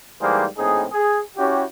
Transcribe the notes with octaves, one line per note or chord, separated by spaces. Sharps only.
G#2 E3 G3 A#3 G#4 C5
A#1 A2 C4 D#4 G#4
G#4
C#4 E4 F#4 G4